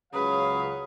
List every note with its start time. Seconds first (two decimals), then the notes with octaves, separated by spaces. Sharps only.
0.13 C#2 C#3 F#3 B4 C#5 F5 D#6